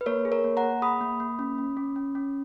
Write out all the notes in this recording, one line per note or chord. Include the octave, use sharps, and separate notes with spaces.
B4
A#3 A#4 C#5
G#4
A#4 C#5
A#3
F#5 A#5
A#3
G#4 B5 D#6
A#3
A#3
C#4
C#4
C#4
C#4
C#4